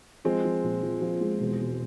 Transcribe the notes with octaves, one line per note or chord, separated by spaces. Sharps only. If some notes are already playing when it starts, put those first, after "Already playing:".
F3 G#3 C4
F3
A#1
F3
F3
G#3
E1
E1